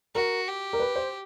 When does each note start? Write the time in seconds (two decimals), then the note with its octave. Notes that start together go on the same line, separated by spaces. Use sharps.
0.15 F#4 A#4
0.47 G4
0.73 A#4
0.80 B4
0.96 C5